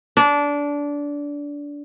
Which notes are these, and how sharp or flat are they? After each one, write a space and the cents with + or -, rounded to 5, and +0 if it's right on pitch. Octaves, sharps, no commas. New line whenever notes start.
D4 -20